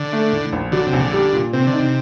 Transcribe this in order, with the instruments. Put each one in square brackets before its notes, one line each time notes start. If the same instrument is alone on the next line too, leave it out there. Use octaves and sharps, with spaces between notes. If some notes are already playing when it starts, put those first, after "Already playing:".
Already playing: [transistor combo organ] D3
[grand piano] A3
A2
A#1
[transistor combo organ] D3 [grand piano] F#3
[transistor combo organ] C3
[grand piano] A#1
[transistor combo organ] D3
[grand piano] G3
A#2
[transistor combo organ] C3 [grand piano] C4
[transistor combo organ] D3
[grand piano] D#4
[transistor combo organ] C3